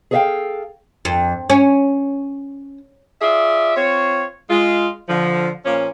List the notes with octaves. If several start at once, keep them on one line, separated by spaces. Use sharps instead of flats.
G#4 A4 C#5 E5 F5 G5
F2
C#4
F4 G#4 D5 E5
C4 F4 C#5
G#3 F4
D3 F3
A#2 F3 A#3 C#4